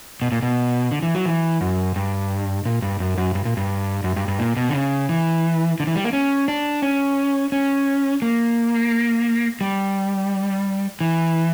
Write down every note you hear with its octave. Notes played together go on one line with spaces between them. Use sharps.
B2
A#2
B2
D3
E3
F#3
E3
F#2
G2
A#2
G2
F#2
F#2
G2
A#2
G2
F#2
G2
G2
A#2
B2
D3
C#3
E3
D3
E3
G3
A#3
C#4
D4
C#4
C#4
A#3
G3
E3